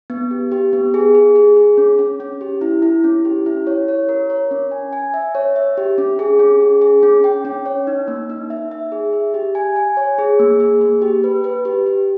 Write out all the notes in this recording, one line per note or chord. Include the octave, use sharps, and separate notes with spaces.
B3
G4
G4
B3
G#4
G#4
G#4
G#4
C#4
C#4
C#4
G4
E4
E4
C#4
G4
E4
C#5
C#5
A#4
C#5
C#4
G#5
G#5
E5
C#5
E5
G4
C#4
G#4
C#4
G#4
G#4
C#4
G5
C#4
C#5
D#4
A#3
D#4
E5
E5
G#4
E5
G4
G#5
G#5
C#5
G#4
A#3
G#4
A#3
G4
B4
B4
G4
G4